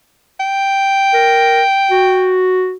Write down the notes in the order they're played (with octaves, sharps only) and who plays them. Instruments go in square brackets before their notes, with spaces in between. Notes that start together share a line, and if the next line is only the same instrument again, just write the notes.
[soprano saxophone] G5
[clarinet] A#4
F#4